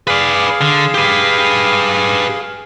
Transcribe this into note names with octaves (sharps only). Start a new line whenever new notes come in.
G#4 B4 D5 F5
D3
G4 B4